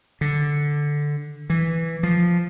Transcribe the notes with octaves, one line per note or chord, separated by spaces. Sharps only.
D3
E3
F3